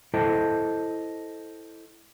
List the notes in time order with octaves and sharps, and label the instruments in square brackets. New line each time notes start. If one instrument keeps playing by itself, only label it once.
[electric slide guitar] E4 A4 C5 D#5 G5 A5